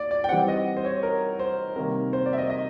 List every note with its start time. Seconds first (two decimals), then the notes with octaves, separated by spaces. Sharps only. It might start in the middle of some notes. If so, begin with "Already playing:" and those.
Already playing: A#3 D5
0.11 D5
0.24 G5
0.29 E3 G3 C4 F#5
0.48 D#5
0.77 C5
0.85 C#5
1.03 A#4
1.39 C5
1.76 C3 D#3 G3 A#3 A#4
2.13 C5
2.26 D5
2.33 E5
2.38 D#5
2.50 D#5